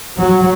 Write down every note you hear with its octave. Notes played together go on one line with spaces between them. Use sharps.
F#3